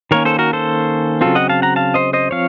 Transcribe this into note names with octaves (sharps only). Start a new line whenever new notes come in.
D#3 A#3 C#4 A#4 C#5
A4 C5
F#4 A#4
A4 C5
C#3 F#3 C4 F4 A4
D#5 F#5
F5 A5
F#5 A#5
F5 A5
C5 D#5
C5 D#5
F3 C4 C#5 F5